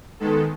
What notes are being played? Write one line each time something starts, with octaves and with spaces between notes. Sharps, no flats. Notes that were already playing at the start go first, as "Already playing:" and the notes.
D#3 G#3 B3 A4